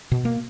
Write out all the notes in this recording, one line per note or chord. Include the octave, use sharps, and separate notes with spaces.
B2
A#3